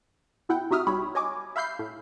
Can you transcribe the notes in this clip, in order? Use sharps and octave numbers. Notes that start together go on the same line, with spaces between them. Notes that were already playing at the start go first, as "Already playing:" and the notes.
B2 E4 F#5 G5
C3 D#4 F#4 E5 D#6 F6
B1 G3 F#4 C#5 B5
C#5 D#5 G#5 D6
E5 F5 B5 G6 C7
A2